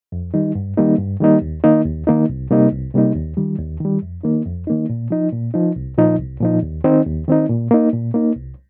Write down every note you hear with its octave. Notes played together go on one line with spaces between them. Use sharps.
F2
D#3 G3 D#4
G2
D#3 G3 A#3 D#4
G2
D#3 G3 A#3 D#4
D#2
D#3 A#3 D#4
D#2
D#3 A#3 D#4
C2
C3 G3 A#3 D#4
C2
C3 G3 A#3 D#4
D#2
D#3 G3
D#2
D#3 G3
F2
D#3 A#3 D#4
F2
D#3 A#3 D#4
A#2
F3 D#4
A#2
F3 D#4
C2
A#2 F3 D#4
C2
A#2 F3 D#4
D#2
D#3 C4 D#4
D#2
D#3 C4 D#4
A#2
A#3 D#4
A#2
A#3 D#4
C2